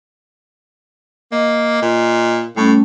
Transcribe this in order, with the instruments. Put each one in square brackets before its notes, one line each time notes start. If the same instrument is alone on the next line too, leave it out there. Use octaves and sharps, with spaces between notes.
[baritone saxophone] A#3 [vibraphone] D#5
[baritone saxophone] A#2
[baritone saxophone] A2 [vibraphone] G3 A3 C#4